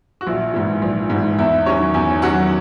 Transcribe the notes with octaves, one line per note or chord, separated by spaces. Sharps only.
F#4
A#1 E4
G#2 E3
A#1
G#2 E3
E2 E4
D#3 F#3 C#4 C#5
E2 G#5
D#3 F#3 C#4 F#5